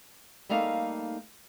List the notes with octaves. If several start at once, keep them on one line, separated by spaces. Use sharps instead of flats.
G3 A3 A#3 D#4 F5